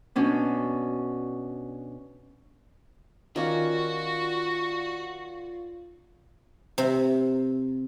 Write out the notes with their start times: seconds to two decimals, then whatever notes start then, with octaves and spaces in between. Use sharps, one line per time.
0.16 B2 C#4 D4
3.36 D#3 C#4 F4 F#4 D5 F5
6.78 C3